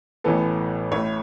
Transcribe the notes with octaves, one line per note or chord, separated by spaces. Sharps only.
A1 A2 E3 B3 A4
A1 A2 A3 C#5